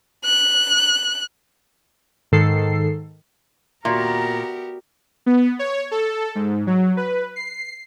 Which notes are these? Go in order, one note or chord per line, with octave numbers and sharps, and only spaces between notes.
F#6
G#2 D#3 A4 C7
A#2 B3 F#4 G4 A#4 D5 E5 A#5
B3
C#5
A4
G#2
F#3
B4
C7